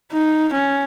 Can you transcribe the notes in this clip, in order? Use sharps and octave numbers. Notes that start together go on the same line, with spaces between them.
D#4
C#4